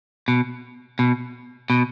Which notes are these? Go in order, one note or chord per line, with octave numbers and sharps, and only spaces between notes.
B2
B2
B2